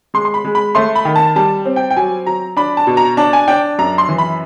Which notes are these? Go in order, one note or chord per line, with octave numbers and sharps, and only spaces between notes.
G#3 C6
C6
B5
G#3
B5
A3 C6
B5
D#3
A5
G3 A5
C4
G5
G5
F#3 G#5
F#3 A#5
D4 B5
A5
B2
A#5
D4 A5
G#5
D4 G5
F#2 A#5
C6
E3
B5